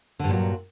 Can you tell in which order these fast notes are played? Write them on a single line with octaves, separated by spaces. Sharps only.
D3 G2 A#2 F#3